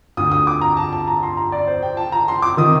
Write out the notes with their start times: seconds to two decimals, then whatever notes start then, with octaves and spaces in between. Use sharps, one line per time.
0.17 D2 D3 D#6
0.32 D#6
0.47 D6
0.61 A#5
0.77 A5
0.93 A5
1.07 A#5
1.23 C6
1.37 A#5
1.52 D5
1.67 C5
1.83 G5
1.97 A5
2.12 A#5
2.28 C6
2.42 D6
2.57 C3 D#3 D#6